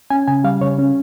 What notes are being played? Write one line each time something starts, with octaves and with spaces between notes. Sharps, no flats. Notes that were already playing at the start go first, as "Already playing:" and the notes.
C#4 G#5
C#3 G#5
G3 F5
C#3 C#5
C#4